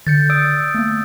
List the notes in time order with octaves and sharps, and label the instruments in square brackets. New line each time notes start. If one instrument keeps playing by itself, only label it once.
[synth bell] D3 C#7 [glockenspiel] G6 A6
[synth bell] D5 [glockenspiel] D#6 E6 D7
[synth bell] A3 A#3